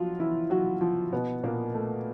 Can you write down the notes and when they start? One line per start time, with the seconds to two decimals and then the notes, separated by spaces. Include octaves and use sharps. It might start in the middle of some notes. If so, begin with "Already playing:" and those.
Already playing: F3 F#3 F4 F#4
0.19 E3 E4
0.50 F#3 F#4
0.81 F3 F4
1.13 B2 B3
1.43 A#2 A#3
1.74 A3